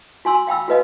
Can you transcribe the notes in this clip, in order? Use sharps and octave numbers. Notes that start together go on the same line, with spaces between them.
F#4 G#5 C6 E6
F5 G5 B5 E6
F#4 A4 B4 D#5 F5